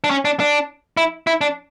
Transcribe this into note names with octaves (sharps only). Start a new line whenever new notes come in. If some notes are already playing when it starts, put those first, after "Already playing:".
D4
C#4
D4
D4
E4
E4
D4